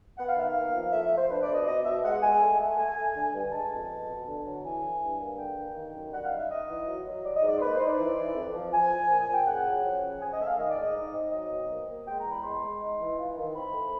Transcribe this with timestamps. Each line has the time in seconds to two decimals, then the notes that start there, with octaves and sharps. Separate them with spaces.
0.18 B3 F#5
0.28 F5
0.36 D#3 E5
0.48 F5
0.55 A#3
0.74 F3
0.92 A3 E5
1.05 E5
1.10 F2
1.17 C5
1.29 D4 B4
1.42 D5
1.48 B2
1.54 D#5
1.66 B2 D#5
1.85 B2 E5
2.04 G#3 F#5
2.22 G#3 G#5
2.41 A3
2.60 A3
2.78 A3 G#5
2.96 A3
3.14 D3
3.34 G2
3.52 G#3 A5
3.71 F2
3.89 B3
4.08 B2
4.27 D3
4.45 F#3
4.63 E3 G#5
4.82 E3
5.01 G2
5.19 A#3
5.38 D3 G5
5.57 A#3
5.75 D#3
5.94 F#2
6.12 G3 F#5
6.24 F5
6.30 D#4
6.37 E5
6.50 D#4 D#5
6.68 E3
6.86 F#3
7.05 F#3
7.23 G3 D5
7.36 D#5
7.42 G#2
7.48 D5
7.56 C5
7.60 A#3 B4
7.73 C5
7.79 D#4
7.86 D5
7.98 E3
8.16 E3
8.35 F2
8.53 F3
8.72 F3 G#5
8.91 F3
9.09 A#2
9.19 G#5
9.27 A#2
9.33 G5
9.46 C#3 F#5
9.65 F#3
9.84 F3
10.02 C#3
10.20 C#4 G#5
10.33 D#5
10.40 A3 E5
10.46 F5
10.58 D#3 D#5
10.70 D5
10.76 G#2
10.82 D#5
10.95 D#4
11.14 C4
11.32 F#3 D#5
11.50 B2
11.69 A#3
11.87 A#3
12.06 G#3 G5
12.18 A#5
12.25 E2
12.31 B5
12.43 G#3 C6
12.62 G#3
12.80 D#4
12.99 E3
13.18 F4
13.36 D#3
13.54 C4 B5
13.73 A3